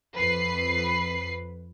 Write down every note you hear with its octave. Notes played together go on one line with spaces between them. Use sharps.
F2 B4 C7